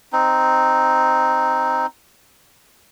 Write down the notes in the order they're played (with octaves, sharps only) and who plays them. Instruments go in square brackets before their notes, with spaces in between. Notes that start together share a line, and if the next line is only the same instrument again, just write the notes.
[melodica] C4 D#4